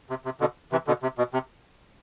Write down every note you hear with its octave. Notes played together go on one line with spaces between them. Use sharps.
C3
C3
B2 D3
C3 E3
B2 D3
C3
B2
C3